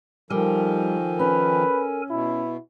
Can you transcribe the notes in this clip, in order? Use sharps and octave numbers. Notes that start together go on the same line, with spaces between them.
D#3 F3 G3 A4 A#4 G#5
C#4 B4
B2 E4